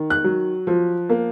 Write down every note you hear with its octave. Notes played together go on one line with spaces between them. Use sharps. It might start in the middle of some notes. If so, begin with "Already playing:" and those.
Already playing: D#3
F#6
F#3
F3
A#3